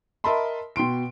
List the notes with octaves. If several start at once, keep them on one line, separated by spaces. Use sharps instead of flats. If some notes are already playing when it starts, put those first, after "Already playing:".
A#4 D#5 E5 A5 B5 C6
B2 G5 C6 D7